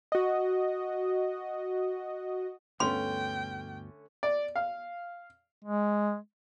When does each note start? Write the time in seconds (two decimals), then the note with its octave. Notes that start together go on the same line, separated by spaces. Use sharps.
0.12 F#4 D#5
2.80 D2 G2 D3 A3 B3 C#4 G5 C6
4.23 D5
4.56 F5
5.64 G#3